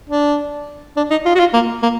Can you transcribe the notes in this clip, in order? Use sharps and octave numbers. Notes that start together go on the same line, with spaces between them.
D4
D4
D#4
F4
F#4
F4
A#3
A#3